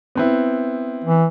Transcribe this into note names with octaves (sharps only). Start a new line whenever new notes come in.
B3 C4 E4
E3